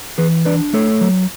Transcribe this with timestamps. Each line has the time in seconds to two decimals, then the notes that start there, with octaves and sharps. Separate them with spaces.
0.18 E3 G#4 B4
0.45 D4 B4 D5
0.73 A3 A4 C#5
1.01 F#3